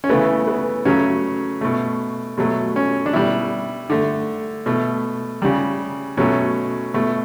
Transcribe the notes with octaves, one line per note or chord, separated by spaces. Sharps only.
C#4
C#3 E3 A3 B3
B3
C#3 F#3 A3 C#4
B2 A3
B2 F#3 A3
C#4
D4
B2 G3 E4
D3 A3
B2 A3
C#3 G3
B2 F#3 A3 C#4
B2 A3